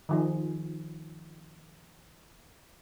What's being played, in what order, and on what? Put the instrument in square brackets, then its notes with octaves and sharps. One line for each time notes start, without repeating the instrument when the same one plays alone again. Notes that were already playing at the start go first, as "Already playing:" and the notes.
[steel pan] D#3 F3 G#4